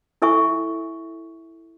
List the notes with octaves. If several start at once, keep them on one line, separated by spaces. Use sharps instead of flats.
E4 A4 E5 G#5 C#6